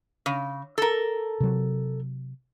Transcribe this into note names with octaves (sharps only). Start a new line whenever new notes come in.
C#3
A4 A#4
C3 F#3